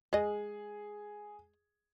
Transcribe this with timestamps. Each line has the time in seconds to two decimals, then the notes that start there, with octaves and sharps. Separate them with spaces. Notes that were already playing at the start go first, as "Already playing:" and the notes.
0.13 G#3 G#4 D#5